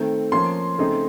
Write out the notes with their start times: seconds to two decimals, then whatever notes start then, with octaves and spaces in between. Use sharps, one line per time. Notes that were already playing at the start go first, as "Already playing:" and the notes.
Already playing: D#3 A3 C4
0.32 F3 A#3 C#4 C6
0.79 C#3 A3 C4 D#4